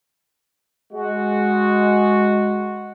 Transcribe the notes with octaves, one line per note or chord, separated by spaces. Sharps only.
G#3 F#4